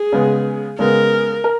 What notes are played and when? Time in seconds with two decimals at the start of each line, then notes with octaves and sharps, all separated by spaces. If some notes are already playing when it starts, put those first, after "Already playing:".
Already playing: G#4
0.12 C#3 G#3 B3
0.79 C#3 G#3 B3 A#4
1.44 A#4